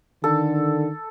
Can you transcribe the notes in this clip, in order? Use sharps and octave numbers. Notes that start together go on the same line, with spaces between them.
D3 D#3 A4